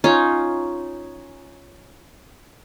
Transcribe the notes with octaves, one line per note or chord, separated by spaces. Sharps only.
C#4 D#4 F4